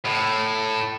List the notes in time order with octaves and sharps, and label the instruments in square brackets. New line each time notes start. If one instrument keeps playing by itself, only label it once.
[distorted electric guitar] A2